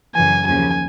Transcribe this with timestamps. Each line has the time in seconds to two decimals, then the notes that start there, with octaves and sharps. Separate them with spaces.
0.15 F#2 C#3 E3 G#5
0.47 D#2 C#3 F3 G#5